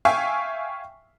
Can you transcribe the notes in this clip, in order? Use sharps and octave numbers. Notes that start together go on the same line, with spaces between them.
E5 F5 G5 G#5 C#6